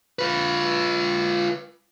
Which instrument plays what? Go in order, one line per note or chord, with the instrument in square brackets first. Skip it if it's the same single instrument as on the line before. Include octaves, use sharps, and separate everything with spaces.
[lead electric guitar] F4 B4